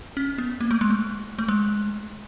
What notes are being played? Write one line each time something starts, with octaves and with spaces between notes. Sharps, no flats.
C#4
B3
A#3
A3
G#3
A3
A3
G#3